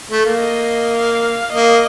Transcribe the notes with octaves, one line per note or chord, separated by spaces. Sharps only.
A3
A#3
D#5
F5
A#3 D#5